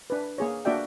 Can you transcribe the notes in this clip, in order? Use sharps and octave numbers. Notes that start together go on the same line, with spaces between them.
D4 B4
A#3 G#4 C#5
A#3 D4 F#4 D5 E5 G5